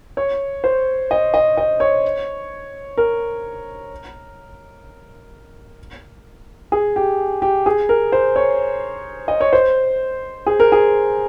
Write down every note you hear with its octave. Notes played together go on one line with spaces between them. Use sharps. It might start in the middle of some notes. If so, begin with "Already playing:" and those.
C#5
C5
D#5
D#5
D#5
C#5
A#4
G#4
G4
G4
G#4
A#4
C5
C#5
D#5
C#5
C5
G#4
A#4
G#4